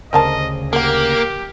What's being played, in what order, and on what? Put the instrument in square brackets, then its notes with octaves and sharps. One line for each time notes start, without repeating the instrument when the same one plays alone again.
[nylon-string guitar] D2 C#3 C5 [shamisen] G3 A#4 A5 [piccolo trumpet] D#5
[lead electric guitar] A#3 [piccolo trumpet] G4 [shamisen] A#4 F#5